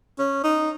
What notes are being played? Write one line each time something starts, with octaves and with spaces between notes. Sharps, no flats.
C#4
D#4